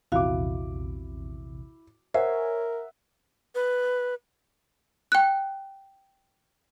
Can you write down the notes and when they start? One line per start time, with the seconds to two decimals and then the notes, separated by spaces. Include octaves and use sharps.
0.12 A#1 E2 C3 E4 F#4 F5 D6
2.14 A#4 C5 C#5 E5 F#5 G#5
3.55 B4
5.12 G5 F#6